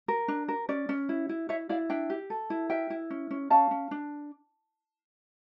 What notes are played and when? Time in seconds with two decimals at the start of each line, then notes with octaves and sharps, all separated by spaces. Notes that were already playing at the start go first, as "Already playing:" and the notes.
0.08 A#4
0.28 D4
0.48 A#4
0.69 C#4 D5
0.89 C#4
1.09 E4
1.29 E4
1.49 E4 C#5 E5
1.69 E4 D5 F5
1.89 D4 E5 G5
2.10 G4
2.30 A4
2.50 E4
2.70 A#4 E5 G5
2.90 E4
3.10 C#4
3.31 C#4
3.50 C#4 F5 A5
3.71 C#4
3.91 D4